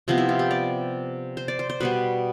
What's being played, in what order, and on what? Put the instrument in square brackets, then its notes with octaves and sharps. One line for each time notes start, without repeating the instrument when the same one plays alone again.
[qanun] C3 F3 B3
E4
F4
G4
D5
C5
D5
C5
C5
B2 G3 B3 B4